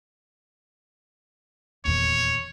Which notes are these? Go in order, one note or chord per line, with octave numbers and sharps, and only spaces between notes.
D#1 E2 C#5